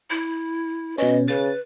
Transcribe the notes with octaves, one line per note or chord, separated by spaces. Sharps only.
E4
B2 C#4 B4 D#5
C#3 B4 A6